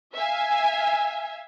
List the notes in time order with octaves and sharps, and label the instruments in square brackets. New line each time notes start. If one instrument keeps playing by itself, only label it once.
[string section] E5 F5 G#5